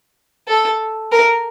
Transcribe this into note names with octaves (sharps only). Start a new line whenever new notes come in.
A4
A#4